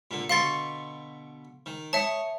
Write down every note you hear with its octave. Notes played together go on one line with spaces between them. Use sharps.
A#2 D3
B2 D3 F5 C6 C#6 A6
D#3
C#5 E5 A5 C#6 D#6